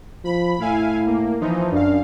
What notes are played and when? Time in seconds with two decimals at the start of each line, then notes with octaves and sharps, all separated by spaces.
0.24 F3 B5
0.60 A2 E4 F5 G#5
1.07 A#3
1.41 E3 F3 D#4
1.72 F#2 D4 F5